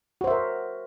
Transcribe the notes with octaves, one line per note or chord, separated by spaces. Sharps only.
F#4 A#4 C5 E5